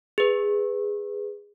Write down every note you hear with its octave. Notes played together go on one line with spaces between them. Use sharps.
G#4 B4